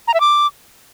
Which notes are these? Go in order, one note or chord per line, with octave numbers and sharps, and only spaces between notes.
A#5
E5
D6